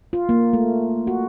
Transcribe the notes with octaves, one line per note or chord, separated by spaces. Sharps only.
F4
A#3
A3
F#4